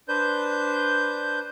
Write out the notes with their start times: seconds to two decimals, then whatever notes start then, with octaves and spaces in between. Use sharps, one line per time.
0.08 D4 B4 C5 G6